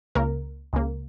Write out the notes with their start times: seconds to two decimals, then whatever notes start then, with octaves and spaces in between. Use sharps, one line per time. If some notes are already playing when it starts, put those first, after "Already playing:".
0.15 C#2 C#3 A#3 A#4
0.73 C#2 C#3 A#3